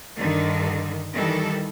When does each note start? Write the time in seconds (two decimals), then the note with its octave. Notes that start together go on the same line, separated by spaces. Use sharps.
0.17 G2 D3 D#3
1.13 D#3 E3 G3 A4